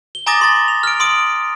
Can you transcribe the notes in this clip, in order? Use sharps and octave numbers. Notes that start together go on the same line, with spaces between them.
G7
G#5 A#5 D6 D#6 A6 A#6
C6 A6
F7
F6 D7
C6 D#6 D7